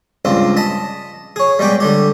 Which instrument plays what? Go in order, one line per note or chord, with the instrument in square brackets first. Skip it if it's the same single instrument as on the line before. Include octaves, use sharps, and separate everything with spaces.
[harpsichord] C#2 G2 C4 F4
D#5 A5 B5
G#4 C#5
G3 G#3 B3 G5 D6
D3 G3 G4